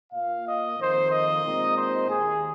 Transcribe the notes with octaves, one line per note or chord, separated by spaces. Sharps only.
A#2 A#3 F4 F5
D#5
F2 D#3 A#3 C5
D#5
A#2 G#3 C4 D#4
C5
D#2 D#3 A#3 G#4